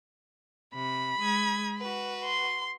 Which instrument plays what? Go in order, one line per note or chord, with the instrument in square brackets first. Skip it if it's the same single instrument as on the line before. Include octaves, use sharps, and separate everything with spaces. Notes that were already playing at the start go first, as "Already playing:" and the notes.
[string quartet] C3 [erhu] B5
[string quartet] G#3 D#6 G#6
F#4 B4
[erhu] C6